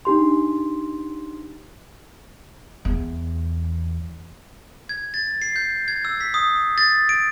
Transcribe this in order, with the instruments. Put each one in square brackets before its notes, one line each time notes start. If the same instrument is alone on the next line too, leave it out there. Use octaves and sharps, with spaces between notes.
[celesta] D4 D#4 G4 C6
[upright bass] E2
[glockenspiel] G#6
A6
C7
G6
G#6
E6
B6
D#6
A6
D7